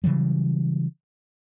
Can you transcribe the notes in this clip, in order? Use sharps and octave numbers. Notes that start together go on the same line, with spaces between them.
C#3 E3 F#3 G3